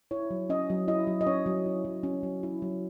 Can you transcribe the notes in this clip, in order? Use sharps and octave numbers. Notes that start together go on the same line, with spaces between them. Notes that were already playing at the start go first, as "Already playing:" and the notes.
E4 C#5
F#3
C#4 D#5
F#3
E4 D#5
F#3
D#5
C#4 C#5
F#3
E4
F#3
C#4
F#3
E4
F#3